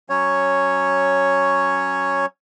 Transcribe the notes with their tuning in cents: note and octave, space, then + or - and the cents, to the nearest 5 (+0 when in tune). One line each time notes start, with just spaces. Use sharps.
F#3 +0 C#4 +0 C#5 +0